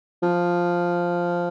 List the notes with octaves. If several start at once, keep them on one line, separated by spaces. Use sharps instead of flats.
F3